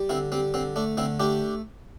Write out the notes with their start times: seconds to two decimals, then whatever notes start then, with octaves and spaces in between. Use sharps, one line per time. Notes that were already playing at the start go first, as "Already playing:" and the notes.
Already playing: G3
0.09 D3 C4 E4
0.32 G3 C4
0.54 D3 C4
0.76 A3 D4
0.97 D3 C4 E4
1.20 A3 D4 G4